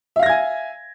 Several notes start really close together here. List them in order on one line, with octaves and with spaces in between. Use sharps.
E5 F5 A#6 G#6 G#5